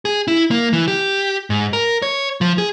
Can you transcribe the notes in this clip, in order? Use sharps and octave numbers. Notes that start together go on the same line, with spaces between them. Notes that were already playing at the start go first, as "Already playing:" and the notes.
G#4
E4
A#3
E3
G4
G#2
A#4
C#5
F3
G#4